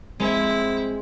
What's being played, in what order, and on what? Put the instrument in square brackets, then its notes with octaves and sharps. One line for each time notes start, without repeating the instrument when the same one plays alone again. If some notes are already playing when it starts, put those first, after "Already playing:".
[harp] G#3 [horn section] C4 [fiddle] E4